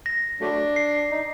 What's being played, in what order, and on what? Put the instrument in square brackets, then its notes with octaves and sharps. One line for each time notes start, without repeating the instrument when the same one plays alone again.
[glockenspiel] A#6
[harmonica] F#3 A3 D4
[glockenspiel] C7
[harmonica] D#4